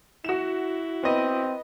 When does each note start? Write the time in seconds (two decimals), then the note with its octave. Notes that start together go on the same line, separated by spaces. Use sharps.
0.25 E4 F#4 E7
1.04 B3 C4 D#5